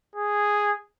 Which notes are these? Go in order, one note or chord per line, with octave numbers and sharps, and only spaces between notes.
G#4